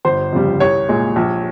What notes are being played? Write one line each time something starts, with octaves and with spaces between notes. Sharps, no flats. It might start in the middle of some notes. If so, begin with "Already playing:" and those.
G1 C5
F2 C#3 G3
C2 C#5
A#2 G#3
A#1